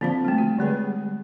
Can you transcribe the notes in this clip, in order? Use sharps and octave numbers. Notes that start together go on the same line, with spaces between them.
D3 F3 A#3 C4 A5
G3 A3
F#4
D3 G3 G#3 G#4 B4